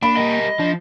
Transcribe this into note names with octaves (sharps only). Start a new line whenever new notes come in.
A#3 D4 B5
G3 A#4 D#5
F3 D4